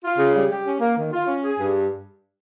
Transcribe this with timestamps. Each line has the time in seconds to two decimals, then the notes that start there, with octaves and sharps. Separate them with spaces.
0.03 F4
0.18 C#3
0.34 G3
0.50 G4
0.65 C#4
0.80 A#3
0.97 D#3
1.12 F4
1.27 C#4
1.43 G#4
1.58 G2